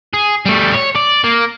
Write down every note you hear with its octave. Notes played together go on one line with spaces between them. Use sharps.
G#4
G3 A3
C#5
D5
A#3